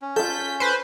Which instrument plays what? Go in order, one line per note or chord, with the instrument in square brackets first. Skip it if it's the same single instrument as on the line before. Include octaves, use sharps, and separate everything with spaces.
[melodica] C#4
[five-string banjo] F4 A4 [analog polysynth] G6 B6
[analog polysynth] B4 C5